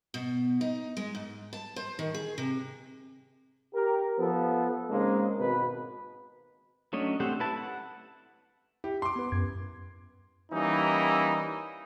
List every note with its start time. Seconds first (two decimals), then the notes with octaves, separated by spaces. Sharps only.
0.14 B2
0.61 D#4
0.97 G#3
1.15 G#2
1.53 A5
1.76 C5
1.99 D#3
2.14 G#4
2.38 C3
3.73 G4 A#4
4.18 F3 B3 A4
4.90 C#3 G#3 A#3 C4 C#4 D#4
5.38 G#1 B2 B4
6.93 F#3 A3 C#4 D4 D#5
7.20 A3 C4 G4 C5 F#5
7.40 E4 B4 A5
7.58 F#5
8.84 E4 G4
9.02 C6 D6
9.16 B3 B4
9.32 F#2 G#6
10.52 E3 G3 A#3 C#4 D#4